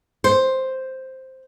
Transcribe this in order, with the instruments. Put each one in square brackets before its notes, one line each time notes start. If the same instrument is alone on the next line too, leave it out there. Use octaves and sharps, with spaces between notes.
[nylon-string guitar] C5